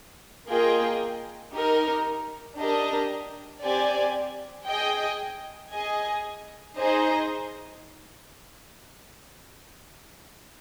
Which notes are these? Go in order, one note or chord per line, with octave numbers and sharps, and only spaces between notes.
A#3 F4 G#4 D#5 G5
D#4 G4 A#4
D4 G4 A#4 D#5
C4 G4 D5 G#5
G#4 D#5 G5
G#4 D#5 G#5
D#4 G#4 C5 D#5